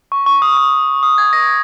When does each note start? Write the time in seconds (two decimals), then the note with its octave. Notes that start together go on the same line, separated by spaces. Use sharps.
0.12 C#6
0.26 C#6
0.42 D#6
0.57 C#6
1.03 D#6
1.18 G#6
1.33 A#6